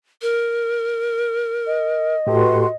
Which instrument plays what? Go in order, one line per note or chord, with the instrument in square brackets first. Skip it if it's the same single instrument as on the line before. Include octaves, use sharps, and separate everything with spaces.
[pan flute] A#4
[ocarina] D#5
[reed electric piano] A2 G4 A4 [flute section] F#4 B4 C6